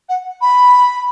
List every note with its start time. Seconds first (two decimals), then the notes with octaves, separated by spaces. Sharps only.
0.09 F#5
0.41 B5